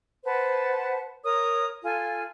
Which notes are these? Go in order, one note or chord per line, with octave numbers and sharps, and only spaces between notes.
B4 C5 F#5 A5
A#4 C#5 D#6
F4 A4 G#5